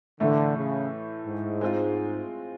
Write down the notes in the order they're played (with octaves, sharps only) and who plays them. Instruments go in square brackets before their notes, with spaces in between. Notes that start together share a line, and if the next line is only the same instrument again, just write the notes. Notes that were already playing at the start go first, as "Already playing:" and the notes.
[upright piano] A2 E3 A3 [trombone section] D3
[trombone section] C#3
G#2
[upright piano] G#3 C4 F4